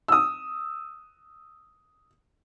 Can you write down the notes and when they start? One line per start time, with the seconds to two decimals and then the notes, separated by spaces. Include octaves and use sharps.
0.08 D#6 E6